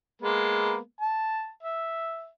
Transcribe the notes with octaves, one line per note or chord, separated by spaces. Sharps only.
G#3 A#3 B3
A5
E5